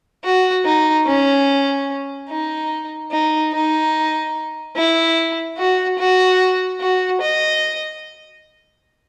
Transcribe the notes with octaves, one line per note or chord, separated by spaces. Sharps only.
F#4
D#4
C#4
D#4
D#4
D#4
E4
F#4
F#4
F#4
D#5